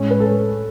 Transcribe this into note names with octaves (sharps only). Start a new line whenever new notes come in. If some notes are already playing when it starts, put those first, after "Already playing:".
Already playing: A2 G#3 C#4
B4
A4